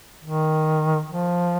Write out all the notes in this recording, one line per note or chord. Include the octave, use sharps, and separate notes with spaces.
D#3
F3